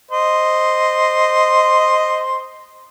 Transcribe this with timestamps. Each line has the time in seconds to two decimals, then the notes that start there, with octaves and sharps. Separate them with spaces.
0.11 C5 D#5